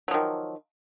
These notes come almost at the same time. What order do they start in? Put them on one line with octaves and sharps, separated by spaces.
F#3 F3 D#3